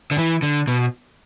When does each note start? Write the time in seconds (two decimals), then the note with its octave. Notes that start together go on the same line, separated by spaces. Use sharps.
0.11 D3
0.18 E3
0.42 D3
0.68 B2